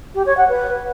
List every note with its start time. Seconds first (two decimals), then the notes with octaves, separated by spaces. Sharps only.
0.15 G4
0.26 C#5
0.37 F#5
0.49 B4